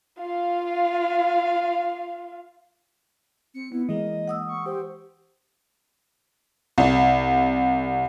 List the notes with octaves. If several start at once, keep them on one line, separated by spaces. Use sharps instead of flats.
F4 F5
C4 C#7
B3 E4
E3 G#3 A#3 D#5
F#5 D#6 E6
C#6
G4 C5
C2